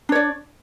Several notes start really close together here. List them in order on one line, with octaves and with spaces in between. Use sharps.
D4 C#5 D5